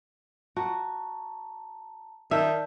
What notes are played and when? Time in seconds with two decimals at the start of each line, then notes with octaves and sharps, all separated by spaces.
0.56 F#4 A5 A#5
2.31 D#3 D5 E5 A5 G6